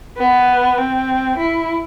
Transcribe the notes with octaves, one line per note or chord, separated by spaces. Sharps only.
B3
C4
E4